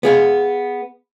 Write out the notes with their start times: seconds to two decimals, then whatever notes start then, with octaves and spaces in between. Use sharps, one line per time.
0.03 B3 G#4 F5